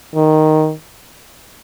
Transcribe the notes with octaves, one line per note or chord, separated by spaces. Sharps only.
D#3